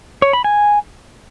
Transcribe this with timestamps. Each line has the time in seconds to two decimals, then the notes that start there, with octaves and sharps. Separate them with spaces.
0.22 C#5
0.33 B5
0.44 G#5